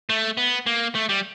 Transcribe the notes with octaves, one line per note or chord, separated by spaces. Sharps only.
A3
B3
A#3
A3
G3